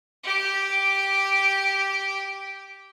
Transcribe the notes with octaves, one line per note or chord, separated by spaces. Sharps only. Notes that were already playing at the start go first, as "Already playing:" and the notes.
G4 D6